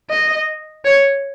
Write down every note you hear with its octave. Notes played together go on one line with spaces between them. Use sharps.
D#5
C#5